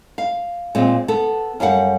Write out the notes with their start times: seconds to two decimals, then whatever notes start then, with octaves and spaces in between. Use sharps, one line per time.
0.18 F5
0.75 A#2 G#3 C4
1.08 B3 A4
1.60 F#2 G3 F5 F#5